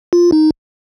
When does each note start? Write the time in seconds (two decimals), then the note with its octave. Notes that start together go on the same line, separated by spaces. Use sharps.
0.13 F4
0.32 D#4